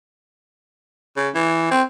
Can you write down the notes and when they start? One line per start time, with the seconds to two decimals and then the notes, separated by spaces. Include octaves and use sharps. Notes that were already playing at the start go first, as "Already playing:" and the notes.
1.16 C#3
1.34 E3
1.71 C4